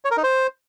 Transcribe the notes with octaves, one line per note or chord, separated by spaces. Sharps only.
C#5
A#4
D#4
C5